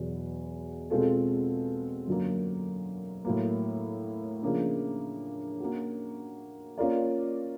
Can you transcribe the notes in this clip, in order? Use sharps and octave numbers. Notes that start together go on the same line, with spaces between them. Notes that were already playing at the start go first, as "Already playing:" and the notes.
Already playing: E2 B2 F#3
B2 G#3 C4 F4 A4
F#2 D3 F#3 A#3
A2 F#3 A#3
C#3 F3 A#3 D4
A#3 C#4 F#4
A#3 C#4 F4 A#4 D5